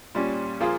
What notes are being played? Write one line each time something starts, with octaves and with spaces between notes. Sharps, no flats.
A#2 G3 C#4
A#2 F3 A#3 F4 G#4